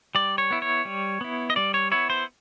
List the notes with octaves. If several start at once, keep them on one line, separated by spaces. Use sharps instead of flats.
G3 D5
C#5
B3 E4
C#5
G3
B3 E4
D#5
G3 D5
C#5
B3 E4 C#5
C5